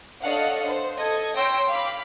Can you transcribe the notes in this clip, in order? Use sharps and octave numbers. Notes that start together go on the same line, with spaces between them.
D4 A4 C#5 D#5 F5 F#5
C5
A4 D#5 G#6
C#5 G5 C6 E6 A#6 D7
F5 B5 D6